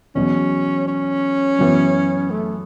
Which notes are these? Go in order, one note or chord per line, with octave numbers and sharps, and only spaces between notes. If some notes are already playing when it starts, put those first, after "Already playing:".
E2 B2 F#3 C#4
C#4
F#2 E3 B3 F#4
A3